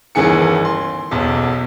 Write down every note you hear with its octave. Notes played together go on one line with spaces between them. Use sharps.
G1 C#2 D#3 E3 G#4 C#7
C6
F#1 B1 E2